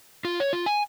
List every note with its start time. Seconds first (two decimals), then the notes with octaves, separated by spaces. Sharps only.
0.25 F4
0.40 C#5
0.53 F4
0.66 G#5